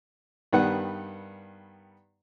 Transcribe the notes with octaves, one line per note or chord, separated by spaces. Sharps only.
G2 D#3 G3 B3 B4 F#5